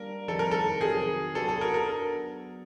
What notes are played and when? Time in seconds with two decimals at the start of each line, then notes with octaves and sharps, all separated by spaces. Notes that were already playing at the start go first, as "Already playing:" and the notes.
Already playing: G3 A#3 D4 A#4
0.28 F2 C3 D#3 G3 A4
0.39 A#4
0.51 A4
0.81 C3 D#3 F#3 G#4
1.35 F#3 B3 D4 F#4 A4
1.49 A4
1.61 A#4
1.74 A#4